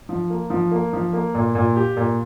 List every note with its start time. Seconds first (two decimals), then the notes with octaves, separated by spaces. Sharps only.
0.09 F3
0.30 A#3
0.50 F3
0.72 A#3
0.93 F3
1.13 A#3
1.34 A#2
1.55 A#2
1.76 G4
1.97 A#2